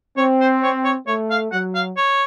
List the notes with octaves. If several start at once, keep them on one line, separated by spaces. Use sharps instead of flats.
C4 C#5
C5
C#5
C#5
A3 C#5
F5
F#3 F#5
F5
C#5